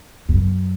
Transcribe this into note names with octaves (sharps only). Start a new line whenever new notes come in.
F#2